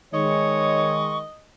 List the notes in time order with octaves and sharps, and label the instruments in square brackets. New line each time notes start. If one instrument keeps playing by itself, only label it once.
[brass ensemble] D#3 G#3 [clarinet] C#5 [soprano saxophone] D#5 [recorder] C#6